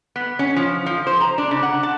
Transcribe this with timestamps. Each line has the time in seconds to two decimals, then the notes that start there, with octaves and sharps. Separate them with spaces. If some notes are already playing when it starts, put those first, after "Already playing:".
0.16 B3
0.39 C#4
0.56 F3
0.86 F3
1.07 C5
1.20 A#5
1.38 D4
1.51 C#3
1.63 F#5
1.83 A5